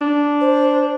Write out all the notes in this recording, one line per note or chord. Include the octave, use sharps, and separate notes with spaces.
D4
C5